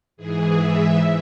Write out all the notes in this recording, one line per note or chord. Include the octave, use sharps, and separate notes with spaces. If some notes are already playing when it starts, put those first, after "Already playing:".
G#2 E3 G#4
G#2 E3 E5